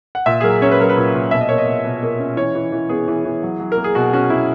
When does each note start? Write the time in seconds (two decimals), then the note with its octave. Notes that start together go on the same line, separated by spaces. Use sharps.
0.15 F#5
0.26 A#2 E5
0.40 G#4
0.43 F#3 A#4
0.62 C#4 C#5
0.72 B4
0.80 F#3 A#4
0.90 B4
0.97 A#2
1.15 A#2
1.31 B2 E5
1.41 D#5
1.49 A#3 C#5
1.58 D#5
1.67 B2
1.85 B2
2.03 A#3
2.19 C#4
2.37 E3 C#5
2.55 E3
2.72 E3
2.89 B3 G#4
3.08 E3
3.25 E3
3.43 F#3
3.60 F#3
3.72 A#4
3.77 A#3
3.84 G#4
3.95 B2 F#4
4.13 C#4 F#4
4.30 B2 E4